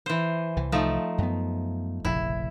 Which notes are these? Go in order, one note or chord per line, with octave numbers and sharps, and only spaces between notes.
E3 C5
C2 E3
F3 A3 D#4
F#2 B3
F1 A#1 C#3 E4